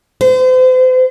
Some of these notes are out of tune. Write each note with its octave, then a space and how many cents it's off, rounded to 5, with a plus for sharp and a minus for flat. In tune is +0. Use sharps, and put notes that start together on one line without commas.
C5 -40